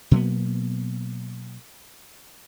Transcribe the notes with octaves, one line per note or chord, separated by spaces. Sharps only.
B2 F#3 A#3 B3